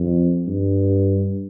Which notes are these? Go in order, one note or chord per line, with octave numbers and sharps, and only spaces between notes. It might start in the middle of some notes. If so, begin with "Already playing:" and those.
Already playing: F2
G2